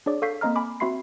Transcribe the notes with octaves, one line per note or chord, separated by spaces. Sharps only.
D4 G#4 C#5 D5 D6
A4 F5 C#6 G6 B6 C7
A#3 C4 D#5 A#5 F6
G#5 B5 D6
C4 F#4 E5 B5 C6 C7